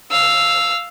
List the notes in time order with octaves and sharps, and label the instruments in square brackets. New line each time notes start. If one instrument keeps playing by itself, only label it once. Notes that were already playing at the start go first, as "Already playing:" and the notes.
[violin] F5 E6